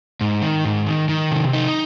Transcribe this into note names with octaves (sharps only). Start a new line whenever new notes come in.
G#2
D#3
G#2
D#3
D#3
C3
D#4